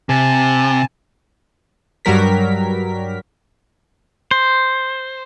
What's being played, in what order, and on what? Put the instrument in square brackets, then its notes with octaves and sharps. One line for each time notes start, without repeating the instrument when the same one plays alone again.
[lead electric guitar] C3 [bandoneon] G#5 A5
[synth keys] G2 F#3 G3 A#4 B6
[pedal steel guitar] C5